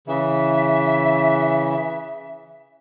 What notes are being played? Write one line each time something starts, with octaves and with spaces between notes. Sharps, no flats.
C#3 E3 E5